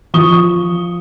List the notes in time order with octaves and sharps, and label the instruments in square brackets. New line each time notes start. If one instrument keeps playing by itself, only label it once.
[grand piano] F3 C#6 D#6 G7